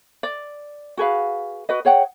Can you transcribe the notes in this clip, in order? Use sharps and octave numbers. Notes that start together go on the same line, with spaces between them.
D5
F#4 G#4 B4 F5
F#4 B4 D#5
G#4 C#5 F#5 G5